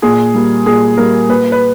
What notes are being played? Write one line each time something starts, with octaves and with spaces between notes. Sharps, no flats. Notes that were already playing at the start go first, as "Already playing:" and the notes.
A#2 G#4
G3 A#3
A#2 G#4
G3 A#3 A#4
A#2 B4
B4